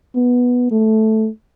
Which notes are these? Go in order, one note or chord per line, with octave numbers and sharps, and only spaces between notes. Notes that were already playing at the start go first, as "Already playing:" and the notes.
B3
A3